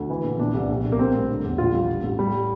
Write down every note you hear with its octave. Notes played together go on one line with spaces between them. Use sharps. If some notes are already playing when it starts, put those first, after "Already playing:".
Already playing: D2
E3
A#1
A#2 D4
C2
A#1
A#1
A#3
G3 C4
A2
D3
E2
A#1 F4
G3
G3
A1
A1 G3